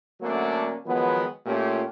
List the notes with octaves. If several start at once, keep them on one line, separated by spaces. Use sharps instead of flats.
D3 F#3 A3 A#3 C#4 D4
D#3 F3 F#3 G#3 B3
A#2 A3 C#4 F4 G4